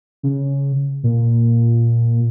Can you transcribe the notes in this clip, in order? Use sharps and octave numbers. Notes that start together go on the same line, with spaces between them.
C#3
A#2